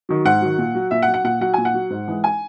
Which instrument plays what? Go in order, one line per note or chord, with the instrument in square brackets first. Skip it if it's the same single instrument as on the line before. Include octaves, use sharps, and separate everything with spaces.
[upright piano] D#3 F#3
G#2 F#5
D#3 F#3
A#2
F#3
A#2 E5
F#5
F#3
F#5
A#2 F#5
F#3 F#5
A#2 G#5
F#5
F#3
G#2
E3 G#3
G#5